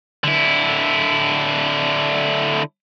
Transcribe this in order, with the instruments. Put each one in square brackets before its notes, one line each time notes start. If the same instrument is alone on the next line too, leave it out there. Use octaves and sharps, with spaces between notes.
[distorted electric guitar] D3 E4